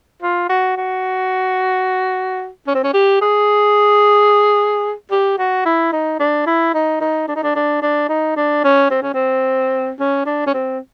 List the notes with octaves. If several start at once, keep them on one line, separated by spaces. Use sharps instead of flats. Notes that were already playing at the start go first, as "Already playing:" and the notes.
F4
F#4
F#4
C#4
C4
C#4
G4
G#4
G4
F#4
E4
D#4
D4
E4
D#4
D#4
D4
D#4
D4
D4
D4
D#4
D4
C#4
C4
C#4
C4
C#4
D4
C#4
C4